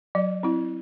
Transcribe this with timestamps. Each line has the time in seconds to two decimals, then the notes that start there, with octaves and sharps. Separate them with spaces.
0.15 F#3 D5
0.43 C4 E4